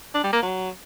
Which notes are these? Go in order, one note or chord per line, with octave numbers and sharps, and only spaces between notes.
D4
G3
A#3
F#3